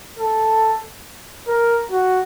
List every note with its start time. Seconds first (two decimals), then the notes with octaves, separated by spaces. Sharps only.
0.18 A4
1.48 A#4
1.91 F#4